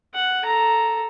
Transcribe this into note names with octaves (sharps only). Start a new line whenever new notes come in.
F#5
A4 A#5